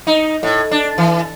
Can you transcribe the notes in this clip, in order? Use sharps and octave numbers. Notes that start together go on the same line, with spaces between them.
D#4
A2
D4
E3